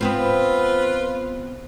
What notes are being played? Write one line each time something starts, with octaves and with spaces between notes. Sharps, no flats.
B3 C4 F4 B4 C5